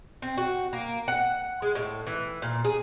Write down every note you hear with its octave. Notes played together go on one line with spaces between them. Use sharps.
C4
F#4
A#3
F#5
G#3
A2
E3
A#2
G#4